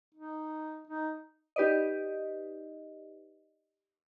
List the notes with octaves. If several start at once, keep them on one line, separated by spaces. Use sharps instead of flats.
D#4
D#4
D#4 G4 B4 D5 D#5